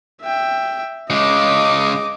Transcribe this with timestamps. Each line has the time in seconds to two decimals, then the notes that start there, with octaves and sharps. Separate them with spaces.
0.22 E5 G5
1.10 C#3 G#3 D#5 D6